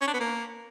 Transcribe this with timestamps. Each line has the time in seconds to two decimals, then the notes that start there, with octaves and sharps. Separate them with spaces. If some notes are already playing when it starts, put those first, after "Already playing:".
0.01 C#4
0.07 D4
0.14 B3
0.20 A#3